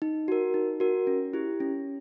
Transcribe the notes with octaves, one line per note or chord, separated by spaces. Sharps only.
D#4
F#4 A#4
D#4
F#4 A#4
C#4
E4 G4
C#4